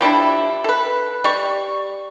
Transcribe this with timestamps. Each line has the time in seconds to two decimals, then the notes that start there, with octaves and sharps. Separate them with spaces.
0.01 F3 G3 D4 E4
0.64 A4 B4
1.24 G3 C#6